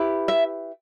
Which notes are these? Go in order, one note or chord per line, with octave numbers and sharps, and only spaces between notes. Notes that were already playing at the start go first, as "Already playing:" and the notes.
Already playing: E4 G4 B4
E5